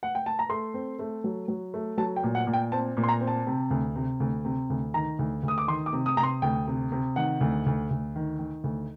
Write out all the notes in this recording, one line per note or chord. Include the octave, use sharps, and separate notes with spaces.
F#5
G5
A5
A#5
A3 C6
C4
A3
F#3
F#3
A3
F#3 A5
G5
A#2
F#5
A#2
G5
C4 A5
A#2
C6
A#5
C4
A5
C3
D2
C3
D2
C3
D2
D#3 A#5
D2
D2
D#6
D6
D#3 C6
D6
C3
D#6
C3 A#5
C6
D2 G5
C3
C3
D#3 F#5
D2
D2
D2
D#3
D#3
D2